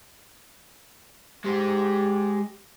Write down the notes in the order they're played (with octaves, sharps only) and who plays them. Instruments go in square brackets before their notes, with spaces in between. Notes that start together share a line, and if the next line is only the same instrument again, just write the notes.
[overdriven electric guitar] G#3 C5 [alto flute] G4